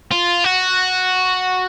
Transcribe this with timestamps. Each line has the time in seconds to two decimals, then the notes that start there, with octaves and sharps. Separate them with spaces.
0.11 F4
0.44 F#4